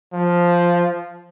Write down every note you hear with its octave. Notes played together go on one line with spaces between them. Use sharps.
F3